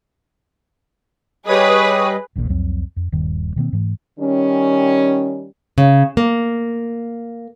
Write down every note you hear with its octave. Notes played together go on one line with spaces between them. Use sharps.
G3 G4 G#4 B4 C#5 D#5 B5 D#6
D#1 A#1 E2 A#2
C2 F2 F#3 C4
F2
D#1 G2 D#3
B2 D#3 A#3 C4
G#2 E3 A3
D#3 G3 C#4
C#3
A#3